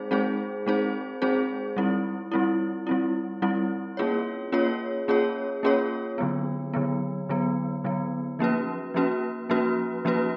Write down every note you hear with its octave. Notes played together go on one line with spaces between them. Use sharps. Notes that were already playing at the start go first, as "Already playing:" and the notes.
Already playing: G#3 C4 D#4 G#4 C5
G#3 C4 D#4 G#4 C5
G#3 C4 D#4 G#4 C5
G#3 C4 D#4 G#4 C5
G3 C4 E4
G3 C4 E4
G3 C4 E4
G3 C4 E4
A#3 C#4 F4 G#4 C#5
A#3 C#4 F4 G#4 C#5
A#3 C#4 F4 G#4 C#5
A#3 C#4 F4 G#4 C#5
D3 F#3 B3
D3 F#3 B3
D3 F#3 B3
D3 F#3 B3
F3 A#3 C#4 F#4 B4
F3 A#3 C#4 F#4 B4
F3 A#3 C#4 F#4 B4
F3 A#3 C#4 F#4 B4